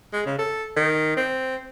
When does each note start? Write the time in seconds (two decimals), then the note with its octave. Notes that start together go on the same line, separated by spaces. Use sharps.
0.13 G#3
0.26 C#3
0.39 A4
0.76 D#3
1.17 C4